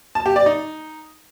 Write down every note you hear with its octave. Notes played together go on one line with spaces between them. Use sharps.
A5
G4
D5
D#4